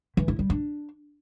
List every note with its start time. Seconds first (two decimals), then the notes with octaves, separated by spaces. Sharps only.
0.17 E3
0.28 E4
0.39 G3
0.50 D4